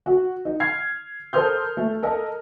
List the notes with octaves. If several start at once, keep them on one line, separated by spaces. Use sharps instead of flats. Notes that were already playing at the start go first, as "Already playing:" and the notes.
F#4
D#4
F6 G#6 C7
A4 A#4 C5 D#6 F6 G6
A3
A4 A#4 D#5